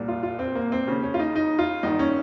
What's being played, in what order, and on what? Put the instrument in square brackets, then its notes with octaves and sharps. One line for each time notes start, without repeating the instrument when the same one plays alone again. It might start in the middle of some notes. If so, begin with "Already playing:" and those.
Already playing: [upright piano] C2 A#2
F4
F4
C4
A#3
C4
D#2 C#3 C#4
C#4
F4
D#4
D#4
F4
G#1 G2 D#3 D#4
C#4